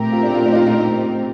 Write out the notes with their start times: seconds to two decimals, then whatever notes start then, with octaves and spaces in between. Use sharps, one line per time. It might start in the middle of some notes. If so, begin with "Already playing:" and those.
Already playing: A#2 A3 C4 G4 A#4
0.12 F4
0.23 D4
0.34 F4
0.45 D4
0.52 D#4
0.56 F4
0.67 F4
0.78 D#4